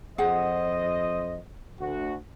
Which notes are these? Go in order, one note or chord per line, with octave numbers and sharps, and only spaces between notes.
F2 G#4 C5 D#5 F#5
D2 F#4